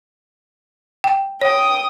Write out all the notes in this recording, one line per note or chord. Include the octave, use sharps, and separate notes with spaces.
G5
C#5 G5 D#6